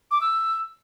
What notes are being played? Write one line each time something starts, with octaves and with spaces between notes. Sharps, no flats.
D6
E6